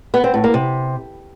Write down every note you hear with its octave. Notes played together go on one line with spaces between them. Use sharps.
B3
C4
A2
A#3
C3